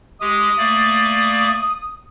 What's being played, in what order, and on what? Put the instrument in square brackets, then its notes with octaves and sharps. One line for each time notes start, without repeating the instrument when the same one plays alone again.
[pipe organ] G#3 G4 [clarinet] D#6
[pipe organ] A3 A#3 D5